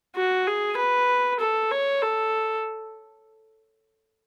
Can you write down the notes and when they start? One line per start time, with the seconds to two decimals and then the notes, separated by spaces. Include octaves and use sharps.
0.16 F#4
0.47 G#4
0.77 B4
1.40 A4
1.71 C#5
2.02 A4